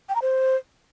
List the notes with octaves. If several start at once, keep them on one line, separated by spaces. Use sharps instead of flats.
G5
A#5
C5